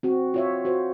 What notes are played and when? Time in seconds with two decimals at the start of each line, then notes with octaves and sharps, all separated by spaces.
0.03 C4 F#4
0.34 F4 C#5 E5
0.65 F#4 C5